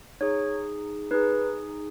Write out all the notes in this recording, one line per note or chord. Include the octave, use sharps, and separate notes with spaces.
D#4 G#4 C#5
D#4 G#4 B4